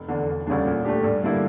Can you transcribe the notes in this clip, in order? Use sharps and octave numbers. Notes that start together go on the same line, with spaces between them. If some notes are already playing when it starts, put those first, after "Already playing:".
Already playing: F1
E2 D3
E1
D2 C#3 G3 D4
A#2
A3 D4 G4
G2
D3 G3 A#3 E4